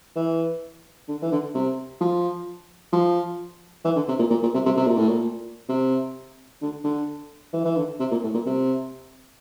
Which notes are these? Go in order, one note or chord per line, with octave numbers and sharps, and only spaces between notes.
E3
D3
E3
D3
C3
F3
F3
E3
D3
C3
A#2
A#2
A#2
C3
C3
C3
A#2
A2
A#2
C3
D3
D3
E3
E3
D3
C3
A#2
A2
A#2
C3